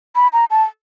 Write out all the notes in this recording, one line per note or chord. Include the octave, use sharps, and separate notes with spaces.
B5
A#5
A5